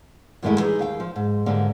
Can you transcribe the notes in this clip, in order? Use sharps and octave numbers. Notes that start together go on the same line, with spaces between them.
F#2 D#3 G#3 A3 E4 D#5
E3 G3 D#4 G#4
D#2 F5 G5
F3
G#2
G#2 D3 G3 A#3